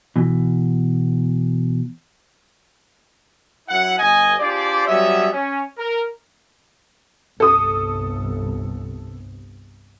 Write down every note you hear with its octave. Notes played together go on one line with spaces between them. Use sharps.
B2 E3
F#2 E4 F#5
G1 D#5 G#5
D4 F4 G4 G#4 C5 D5
F#3 G3 B3 C#4 D#5 E5
C#4
A#4
G1 C2 A4 D#6